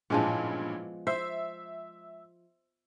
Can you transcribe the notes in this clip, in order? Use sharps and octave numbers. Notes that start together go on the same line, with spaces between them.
A1 G2 A#2 F3 G#3 B3
C5 E5